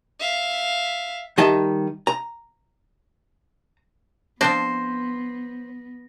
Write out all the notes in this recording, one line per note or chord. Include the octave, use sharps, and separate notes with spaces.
E5 F5
D#3 G3 D#5 E5 A5
A#5
F3 B3 C4 D4 C5 A#6